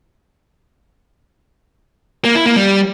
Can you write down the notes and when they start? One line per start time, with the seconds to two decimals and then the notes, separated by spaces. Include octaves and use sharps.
2.24 A#3
2.35 E4
2.46 A#3
2.56 G3